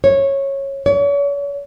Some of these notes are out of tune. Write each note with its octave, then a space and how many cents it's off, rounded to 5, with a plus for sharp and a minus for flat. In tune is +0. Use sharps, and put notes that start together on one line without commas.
C#5 -15
C#5 +40